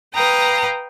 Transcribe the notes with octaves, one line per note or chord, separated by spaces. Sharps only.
B4 F5 G5 A#5 D#6